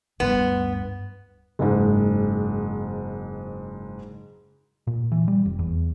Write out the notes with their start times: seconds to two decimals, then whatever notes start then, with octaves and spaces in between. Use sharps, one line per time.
0.20 D1 G2 B3
1.59 F#1 G#2
4.87 A#2
5.12 E3
5.28 G3
5.45 F1
5.59 E2